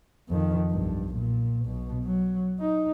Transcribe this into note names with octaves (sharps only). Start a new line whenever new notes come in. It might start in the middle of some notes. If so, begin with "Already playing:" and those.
F2 D#3
B1 G2
A#2
B1 B2
F#3
D#4